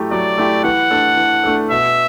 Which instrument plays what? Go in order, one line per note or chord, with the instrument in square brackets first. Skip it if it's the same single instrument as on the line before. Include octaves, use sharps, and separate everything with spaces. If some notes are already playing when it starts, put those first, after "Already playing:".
Already playing: [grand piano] F#3 A3 E4 G4
[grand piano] F#3 [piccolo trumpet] D5
[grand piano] A3 E4 G4
[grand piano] E3 [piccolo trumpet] F#5
[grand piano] A3 D4 A4
E3
A3 D4 A4
[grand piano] B2 [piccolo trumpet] E5